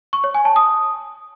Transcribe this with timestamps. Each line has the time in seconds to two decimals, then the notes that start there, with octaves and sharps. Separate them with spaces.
0.13 C#6
0.24 C#5
0.34 G#5
0.45 A5
0.56 D#6